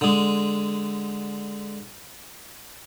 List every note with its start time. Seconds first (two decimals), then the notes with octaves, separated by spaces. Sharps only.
0.01 D3 G#3